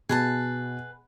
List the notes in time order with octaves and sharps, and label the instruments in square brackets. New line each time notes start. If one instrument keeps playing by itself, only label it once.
[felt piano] B2 [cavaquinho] G#4 B4 A5